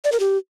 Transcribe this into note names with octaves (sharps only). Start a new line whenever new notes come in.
D5
A#4
G4